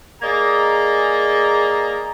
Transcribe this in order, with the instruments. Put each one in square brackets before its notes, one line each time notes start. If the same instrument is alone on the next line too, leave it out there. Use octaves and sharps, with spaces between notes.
[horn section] A#3 G#4 D5 D#5 A#5